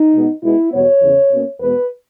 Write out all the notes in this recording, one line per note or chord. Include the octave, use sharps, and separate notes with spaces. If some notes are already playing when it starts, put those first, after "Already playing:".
Already playing: D#4
B2 G#3 B3
B2 G#3 B3 E4
E2 B2 G3 B3 C#5
E2 C#3 E3
B2 A#3 C#4
E2 B2 G#3 B3 B4